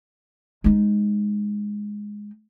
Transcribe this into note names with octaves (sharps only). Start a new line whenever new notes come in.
G#3 D#4